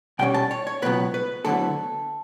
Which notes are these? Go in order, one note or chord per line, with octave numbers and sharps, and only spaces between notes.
B2 G3 C#4 G5
A5
C#5
C#5
C#2 B2 F#3 B3 B4
B4
D2 D3 F#3 B3 E4 A4